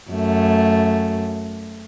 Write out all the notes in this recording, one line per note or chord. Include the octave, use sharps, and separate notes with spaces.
F#2 A3